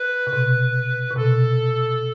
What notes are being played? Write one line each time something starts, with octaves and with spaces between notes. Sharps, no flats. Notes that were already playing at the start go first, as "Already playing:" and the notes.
Already playing: B4
C3
B2
C3
B2 A4